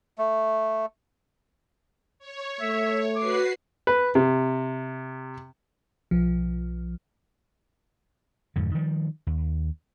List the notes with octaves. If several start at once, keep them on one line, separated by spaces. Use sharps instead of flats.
A3
C#5
A3 E5
F#4 B4 D6 C7
B4
C3
B1 F3
F2 G#2 D3
D#3 F3 G3
D#2